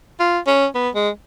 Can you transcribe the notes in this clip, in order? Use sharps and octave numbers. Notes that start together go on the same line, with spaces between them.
F4
C#4
B3
G#3